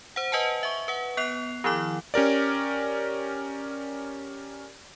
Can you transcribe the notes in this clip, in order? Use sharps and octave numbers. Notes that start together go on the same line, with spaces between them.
C5 F#5
B4 D#5 F#5 G#5 A5
E5 C#6 G7
B4 F#5
B3 F#6 C7 F7
D#3 F3 E4 D6
C#4 G4 A#4 D5